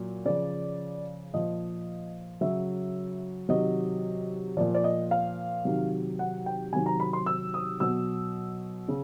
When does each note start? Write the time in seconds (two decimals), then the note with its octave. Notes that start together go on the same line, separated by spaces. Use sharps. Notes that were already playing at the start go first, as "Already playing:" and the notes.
Already playing: A#2 F#3
0.25 C#3 F3 D5
1.33 A#2 F3 D#5
2.41 C#3 F#3 E5
3.49 C3 D#3 F#3 D#5
4.57 A#2 F3 D5
4.75 D5
4.84 D#5
5.11 F5
5.65 C3 D#3 F#3
6.19 F#5
6.46 G5
6.73 C3 D#3 F#3 G#5
6.86 A#5
7.00 B5
7.13 C6
7.26 E6
7.54 D#6
7.80 B2 F#3 E6
8.88 C#3